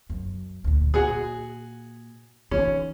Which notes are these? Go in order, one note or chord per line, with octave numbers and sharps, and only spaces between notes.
F#2
D2 A#2
A#2 F#4 G#4
E3 C#4 D#4